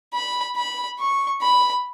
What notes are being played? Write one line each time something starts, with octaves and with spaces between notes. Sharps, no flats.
B5
B5
C#6
B5